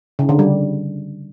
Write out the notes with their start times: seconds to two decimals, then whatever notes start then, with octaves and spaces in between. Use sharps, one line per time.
0.19 C#3
0.29 D3
0.39 G3